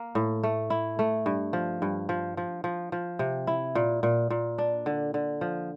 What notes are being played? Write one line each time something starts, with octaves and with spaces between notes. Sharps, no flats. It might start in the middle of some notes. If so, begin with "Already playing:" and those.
Already playing: A#3
A2
A3
E4
A3
G2
F3
G2
F3
F3
F3
F3
C3
E4
A#2
A#2
A#2
D4
D3
D3
F3